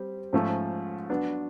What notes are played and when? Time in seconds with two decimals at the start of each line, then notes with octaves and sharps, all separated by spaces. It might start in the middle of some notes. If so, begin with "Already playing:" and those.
Already playing: G3 C4 G4
0.33 G#2 F3 A3 C#4
1.10 F#3 B3 D4